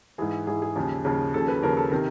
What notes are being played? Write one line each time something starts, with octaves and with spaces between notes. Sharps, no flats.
G#2 E3 G#4
G#2 E3 G#4
G#4
D#2 C#3 F3
D#2 C#3 F3
D#2 C#3 F3 A4
B4
D#2 C#3 F3 A#4
A4
C3 D#3 A#4